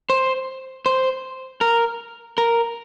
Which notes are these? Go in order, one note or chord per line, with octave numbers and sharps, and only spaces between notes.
C5
C5
A#4
A#4